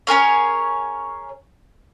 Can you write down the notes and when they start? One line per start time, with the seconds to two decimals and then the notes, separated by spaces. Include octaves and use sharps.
0.07 C#4 G#4 A#4 C#5